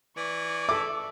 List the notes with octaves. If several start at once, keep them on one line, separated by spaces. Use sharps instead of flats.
E3 D5 C#6
A4 E5 D6